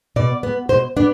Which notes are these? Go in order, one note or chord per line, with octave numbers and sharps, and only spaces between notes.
B2 D5
B3
B2 C5
B3 D4